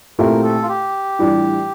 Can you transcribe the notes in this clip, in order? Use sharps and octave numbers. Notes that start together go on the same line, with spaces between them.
A#2 A3 C4 E4 G4 A#4
A4
F4
G4
A2 E3 G3 D4 F4